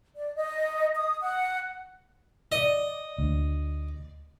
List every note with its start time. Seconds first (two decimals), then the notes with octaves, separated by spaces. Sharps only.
0.16 D5
0.35 D#5
0.95 D#6
1.20 F#5
2.52 D5 D#5
3.18 D2